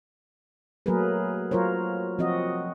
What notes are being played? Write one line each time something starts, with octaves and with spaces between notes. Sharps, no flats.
F#3 A3 A#3 G#4 A#4 B4
F#3 F4 A#4 C5 C#5
F3 C4 F#4 D#5